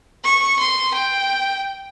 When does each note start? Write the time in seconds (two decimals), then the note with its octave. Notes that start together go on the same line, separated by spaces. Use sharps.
0.24 C#6
0.59 C6
0.94 G5